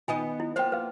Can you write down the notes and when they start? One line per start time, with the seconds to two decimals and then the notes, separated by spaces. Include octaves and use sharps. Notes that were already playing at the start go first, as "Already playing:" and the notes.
0.08 D#3 B3 F4 D#5 G#5
0.40 E4
0.56 A#3 B3 F4 C5 G5
0.72 B4 F5